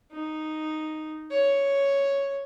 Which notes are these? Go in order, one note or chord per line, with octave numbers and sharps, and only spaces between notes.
D#4
C#5